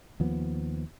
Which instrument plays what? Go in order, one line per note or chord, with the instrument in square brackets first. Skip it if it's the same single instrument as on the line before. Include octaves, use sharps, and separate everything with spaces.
[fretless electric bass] D#2 F3 B3